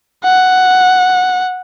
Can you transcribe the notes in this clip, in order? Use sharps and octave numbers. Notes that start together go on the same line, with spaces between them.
F#5